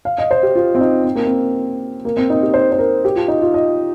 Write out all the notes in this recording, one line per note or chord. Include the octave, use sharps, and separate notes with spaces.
F5
D#5
C5
G4
F4
C4
D#4
C4
A#3
C4
A#3
C4
D#4
G4
C5
C5
A#4
G4
F4
D#4
F4
D#5